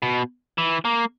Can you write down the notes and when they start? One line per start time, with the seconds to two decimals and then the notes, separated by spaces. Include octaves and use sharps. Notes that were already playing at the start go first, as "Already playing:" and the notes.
0.02 B2
0.58 E3
0.85 A#3